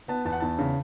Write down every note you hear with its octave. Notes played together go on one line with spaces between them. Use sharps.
B3 A5
E2 A5
F#5
E2 A5
C#3